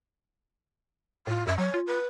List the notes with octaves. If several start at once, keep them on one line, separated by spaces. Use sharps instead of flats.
A2 F4
F#2 E5
F#3 C#5
F4
B4